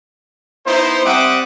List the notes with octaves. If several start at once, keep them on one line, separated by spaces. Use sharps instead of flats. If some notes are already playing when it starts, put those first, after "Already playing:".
B3 D#4 E4 C5
G3 C4 E5 F#5 D6 D#6